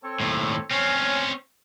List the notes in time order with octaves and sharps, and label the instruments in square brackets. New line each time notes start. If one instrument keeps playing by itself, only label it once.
[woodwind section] C4 A4 C#5
[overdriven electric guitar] D#2 A2
[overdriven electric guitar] C4 C#4 [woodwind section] C#5 G#5 F6